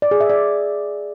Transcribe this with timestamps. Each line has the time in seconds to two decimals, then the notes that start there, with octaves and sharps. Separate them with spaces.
0.02 D5
0.11 G#4
0.20 E5
0.30 D5